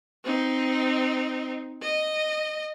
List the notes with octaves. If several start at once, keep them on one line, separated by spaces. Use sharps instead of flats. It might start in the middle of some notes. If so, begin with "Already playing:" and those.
C4 D#4
D#5